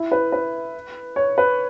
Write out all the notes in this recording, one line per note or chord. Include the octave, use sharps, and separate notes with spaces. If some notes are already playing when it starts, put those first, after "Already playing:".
Already playing: E4
B4
B4
C#5
B4